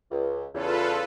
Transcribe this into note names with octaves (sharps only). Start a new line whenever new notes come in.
C#2
E2 C#3 F4 A4 B4